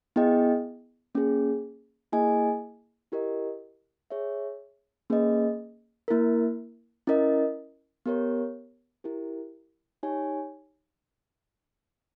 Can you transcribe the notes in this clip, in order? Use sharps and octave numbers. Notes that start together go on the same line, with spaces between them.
B3 E4 G#4 D#5 G5
A#3 C#4 G#4
A#3 E4 G#4 D#5 G#5
E4 G4 A#4 D#5
G#4 C#5 E5
A#3 C#4 G#4 B4 D#5
A#3 E4 A#4
C#4 E4 A#4 D#5
B3 G4 A#4 C#5
E4 G4 A#4
D#4 G4 C#5 G#5